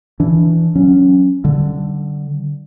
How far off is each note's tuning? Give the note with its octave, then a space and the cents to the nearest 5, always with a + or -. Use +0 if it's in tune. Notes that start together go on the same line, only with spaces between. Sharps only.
E3 +0 D4 -15
F#3 +0 C#4 +0
D3 +0 G3 -45